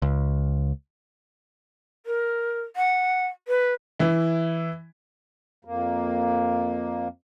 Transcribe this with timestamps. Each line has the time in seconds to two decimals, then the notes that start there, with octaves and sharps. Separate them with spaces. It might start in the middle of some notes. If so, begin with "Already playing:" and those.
0.02 C#2
2.06 A#4
2.76 F#5
3.48 B4
3.99 E3 E4
5.65 F2 A#3